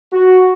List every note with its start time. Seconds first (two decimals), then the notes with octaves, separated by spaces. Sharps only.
0.11 F#4